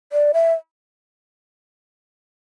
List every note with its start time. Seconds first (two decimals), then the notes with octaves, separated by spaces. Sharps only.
0.12 D5
0.34 E5